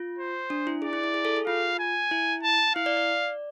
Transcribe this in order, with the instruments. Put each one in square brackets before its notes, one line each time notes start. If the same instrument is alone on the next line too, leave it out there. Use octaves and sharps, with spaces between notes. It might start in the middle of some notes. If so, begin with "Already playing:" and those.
Already playing: [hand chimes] F4
[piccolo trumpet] C5
[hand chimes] D4
E4
[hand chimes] G#4 [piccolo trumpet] D5
[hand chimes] E4
E4
G#4
A4
G#4
[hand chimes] F4 [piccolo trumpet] F5
[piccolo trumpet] G#5
[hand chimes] E4
[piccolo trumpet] A5
[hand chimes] E4 [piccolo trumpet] F5
[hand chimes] D5
D5